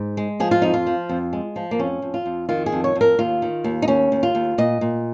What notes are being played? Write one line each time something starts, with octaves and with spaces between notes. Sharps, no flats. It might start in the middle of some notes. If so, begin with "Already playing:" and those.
Already playing: G#2
G#3
F3 G#4
F4
F2 D#4
F4
F3
F2
G#3
F3
A#3
F2 C#4
F2
F4
F2
D#3 F4
G#4
F2
C#5
F2
A#4
D#2 F4
D#3
D#2
D#4
D#2 C#4
D#2
F4
D#2
A#2 D#5
A#2